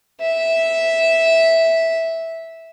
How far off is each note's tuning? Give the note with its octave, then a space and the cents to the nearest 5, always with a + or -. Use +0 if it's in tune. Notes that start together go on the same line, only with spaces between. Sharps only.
E5 -5